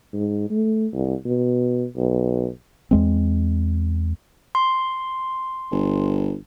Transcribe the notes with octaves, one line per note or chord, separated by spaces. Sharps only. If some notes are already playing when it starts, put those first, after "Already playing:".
G#2
A3
C2
B2
B1
E2 G#3 C4
C6
G1